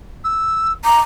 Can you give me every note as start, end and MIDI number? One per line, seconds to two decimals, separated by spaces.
0.24 0.72 88
0.85 1.00 82
0.85 1.02 86